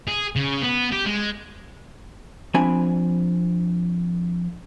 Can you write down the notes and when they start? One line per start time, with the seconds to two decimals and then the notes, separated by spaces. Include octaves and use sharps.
0.08 G#4
0.36 C#3
0.62 B3
0.92 G4
1.06 G#3
2.54 F3 C4 D4 G#5 B5